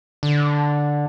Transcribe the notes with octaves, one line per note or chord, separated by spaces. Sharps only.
D3